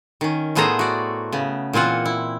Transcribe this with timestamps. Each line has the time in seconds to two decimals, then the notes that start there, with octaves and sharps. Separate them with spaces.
0.21 D#3 C#4
0.55 A2 A3 B3 G#4 C5 A#5
0.79 F#4 D5
1.32 C#3 B3
1.73 A#2 E3 C4 F4 F#5
2.05 E4